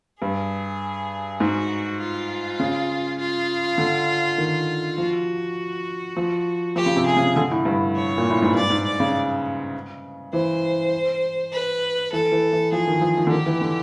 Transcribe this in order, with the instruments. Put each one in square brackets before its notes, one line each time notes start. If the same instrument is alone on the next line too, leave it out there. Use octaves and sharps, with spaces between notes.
[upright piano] G2 [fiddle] G#4
[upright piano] G#2 [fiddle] F#4
[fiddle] F4
[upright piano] C#3
[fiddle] F4
[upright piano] D3
D#3
[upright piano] F3 [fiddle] F#4
[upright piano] F3
[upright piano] F3 [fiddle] G4
[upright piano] C#3
C3
[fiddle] G#4
[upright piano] C#3
D3
A2
G2
[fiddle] C#5
[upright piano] A#2
A2
G#2
[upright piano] G2 [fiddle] D5
[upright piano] G#2
[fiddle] D5
[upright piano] C#3
[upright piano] E3 [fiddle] C5
[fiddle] B4
[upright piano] E3 [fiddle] A4
[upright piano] E3
E3
[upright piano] F3 [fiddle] G#4
[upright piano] D#3
F3
D#3
D3
[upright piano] D#3 [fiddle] G4
[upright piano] E3
D3